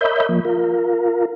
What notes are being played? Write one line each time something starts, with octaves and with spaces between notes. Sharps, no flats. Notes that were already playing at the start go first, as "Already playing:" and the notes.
A#4 C#5 D#5 E5 B5 G6
F3 A#3
F4 A#4